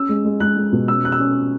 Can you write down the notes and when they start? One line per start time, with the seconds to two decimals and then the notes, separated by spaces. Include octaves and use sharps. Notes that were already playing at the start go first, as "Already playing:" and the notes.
Already playing: C#4 E6
0.09 G#3
0.25 G#3
0.40 G#3 F#6
0.57 G#3
0.73 B2
0.88 C#4 E6
1.04 C#4 F#6
1.12 E6
1.20 C#4